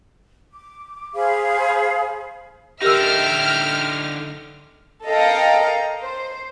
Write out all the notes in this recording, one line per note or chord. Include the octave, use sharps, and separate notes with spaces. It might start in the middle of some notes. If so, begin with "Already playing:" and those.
D6
G#4 C5 F5 B5
D3 D#4 G4 A#4 E5 G5 E6 F6
A4 A#4 D#5 F5 G5 A#5
C5